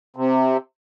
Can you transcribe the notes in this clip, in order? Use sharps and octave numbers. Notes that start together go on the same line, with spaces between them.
C3